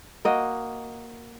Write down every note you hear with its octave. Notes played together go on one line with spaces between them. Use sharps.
A#3 F#4 D#5